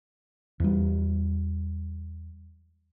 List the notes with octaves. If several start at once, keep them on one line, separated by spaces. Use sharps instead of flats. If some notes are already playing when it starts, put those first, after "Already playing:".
E2 G3